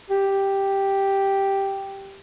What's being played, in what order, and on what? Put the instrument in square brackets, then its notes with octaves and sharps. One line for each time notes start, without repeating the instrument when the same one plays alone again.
[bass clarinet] G4